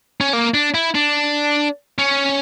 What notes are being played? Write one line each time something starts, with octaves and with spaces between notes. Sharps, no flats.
C#4
A#3
D4
E4
D4
C#4